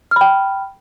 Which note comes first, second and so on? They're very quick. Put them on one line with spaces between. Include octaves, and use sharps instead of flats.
F6 B5 G5